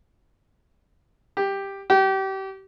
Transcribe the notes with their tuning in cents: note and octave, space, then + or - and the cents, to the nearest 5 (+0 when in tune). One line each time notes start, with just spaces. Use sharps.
G4 +5
G4 -30